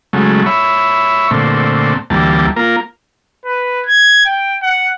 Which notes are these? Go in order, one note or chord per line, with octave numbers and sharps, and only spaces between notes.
C#3 F#3 G#3 A3
C#5 E5 B5
A#2 D3 A3 C4
D2 E3 G3 A#3 A5
A#3 F4 A#4
B4
G#6
G5
F#5